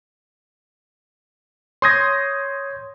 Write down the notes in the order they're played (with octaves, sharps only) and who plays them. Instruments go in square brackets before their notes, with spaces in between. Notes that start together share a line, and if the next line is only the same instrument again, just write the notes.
[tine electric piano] C#5 G6 G#6 [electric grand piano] C6 D#6 A#6